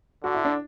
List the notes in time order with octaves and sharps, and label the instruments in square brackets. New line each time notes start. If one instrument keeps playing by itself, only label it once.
[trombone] D3 [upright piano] F#4
[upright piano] E4
D4